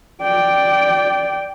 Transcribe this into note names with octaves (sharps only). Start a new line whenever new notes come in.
D5 G5